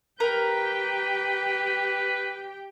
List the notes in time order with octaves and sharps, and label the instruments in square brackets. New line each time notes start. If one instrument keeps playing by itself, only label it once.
[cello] G4 G5 [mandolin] A#4 [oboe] B4